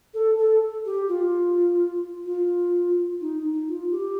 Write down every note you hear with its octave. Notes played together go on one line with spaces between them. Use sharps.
A4
A4
G4
F4
F4
D#4
F4
G4